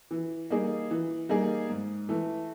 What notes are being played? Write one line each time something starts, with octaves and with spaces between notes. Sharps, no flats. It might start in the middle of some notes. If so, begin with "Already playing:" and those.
E3
G3 A#3 D#4 G#4
E3
G3 A#3 D#4 G#4
G#2
E3 A3